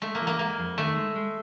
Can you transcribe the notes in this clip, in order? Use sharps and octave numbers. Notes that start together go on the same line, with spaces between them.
G#3 A3
A#3
E3
A#3
G#3 A#3
F2
D#3 A3
G#3
G#3